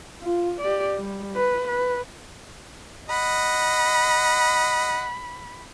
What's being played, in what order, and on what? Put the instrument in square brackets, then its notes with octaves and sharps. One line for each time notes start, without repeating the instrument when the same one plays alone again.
[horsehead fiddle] F4
G4 D5
G3
B4
B4
[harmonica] D#5 F#5 [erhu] B5